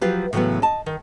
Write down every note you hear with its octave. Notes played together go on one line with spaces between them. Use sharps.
F3 F#3 F4 G4 B4
A2 C#3 E3 F#3 A3 B3
D#5 A5
D#3